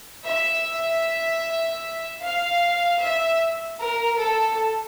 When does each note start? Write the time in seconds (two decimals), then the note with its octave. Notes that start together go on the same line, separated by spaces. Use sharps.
0.26 E5
2.22 F5
3.01 E5
3.80 A#4
4.19 A4